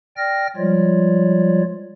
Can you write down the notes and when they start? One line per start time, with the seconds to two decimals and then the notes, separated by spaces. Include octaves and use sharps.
0.17 D5 G5 F6 A#6
0.57 F3 G3 G#3 F4 C#5 D5